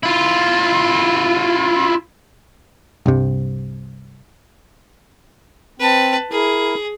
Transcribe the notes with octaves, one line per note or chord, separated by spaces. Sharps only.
E4 F4
C2 G2 C3
C4 B4 A5
E4 G#4 A#4